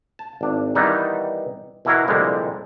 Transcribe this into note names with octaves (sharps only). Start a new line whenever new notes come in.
A5
G#1 D4
D#3 E3 G3 B3 D#4
B2 E3 E4 F#4 A#4 F5
C2 F2 A#2 D3 G3 G#3